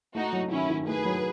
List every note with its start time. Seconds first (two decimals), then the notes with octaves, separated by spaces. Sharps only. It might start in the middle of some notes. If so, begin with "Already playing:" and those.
0.15 A3 D#4 F#4
0.33 F#3
0.51 D#3 C#4 E4
0.70 D#3
0.87 A3 G#4 B4
1.05 F#3